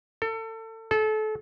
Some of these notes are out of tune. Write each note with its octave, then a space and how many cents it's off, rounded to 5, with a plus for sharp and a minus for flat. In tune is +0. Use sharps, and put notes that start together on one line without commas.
A4 +30
A4 -30